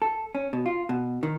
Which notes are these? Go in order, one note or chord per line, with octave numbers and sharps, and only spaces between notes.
A4
C#4
B2
F4
B2
D#3